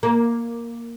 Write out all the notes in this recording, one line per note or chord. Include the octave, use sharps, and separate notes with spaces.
A#3